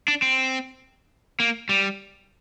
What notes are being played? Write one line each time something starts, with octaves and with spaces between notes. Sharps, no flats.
D4
C4
A#3
G3